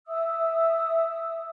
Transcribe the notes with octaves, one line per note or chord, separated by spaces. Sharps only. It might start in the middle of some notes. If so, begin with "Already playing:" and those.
E5 D#6 E6